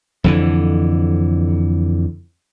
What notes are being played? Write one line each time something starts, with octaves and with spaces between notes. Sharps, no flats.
F2 D3 E3